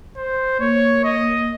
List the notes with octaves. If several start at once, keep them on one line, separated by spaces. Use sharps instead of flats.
C5
A#3 C#5
D#5